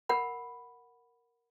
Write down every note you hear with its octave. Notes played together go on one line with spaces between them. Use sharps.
A#4 F#5 B5